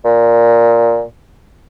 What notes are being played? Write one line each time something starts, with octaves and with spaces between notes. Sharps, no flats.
A#2